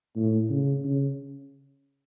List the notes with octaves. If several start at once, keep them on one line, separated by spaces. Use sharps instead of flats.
A2
C#3
C#3